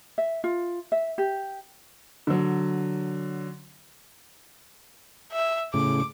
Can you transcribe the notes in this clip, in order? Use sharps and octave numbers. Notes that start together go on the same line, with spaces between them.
E5
F4
E5
G4
D3 F#3
E5
A2 C#3 D6